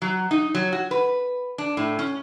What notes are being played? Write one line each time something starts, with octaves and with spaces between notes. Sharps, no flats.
F#3
D#4
F#3
F#4
B4
D4
A2
C#4